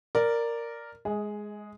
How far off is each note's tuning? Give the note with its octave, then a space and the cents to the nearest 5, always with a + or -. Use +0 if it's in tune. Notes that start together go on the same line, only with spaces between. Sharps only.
A#4 -5 D5 +0
G#3 +0 G#4 +5 D#5 +35